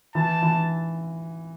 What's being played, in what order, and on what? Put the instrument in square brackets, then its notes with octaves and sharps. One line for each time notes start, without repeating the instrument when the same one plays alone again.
[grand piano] E3 [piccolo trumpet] A5
[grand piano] E3